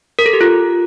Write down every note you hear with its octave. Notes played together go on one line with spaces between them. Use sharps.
A#4
A4
G4
F4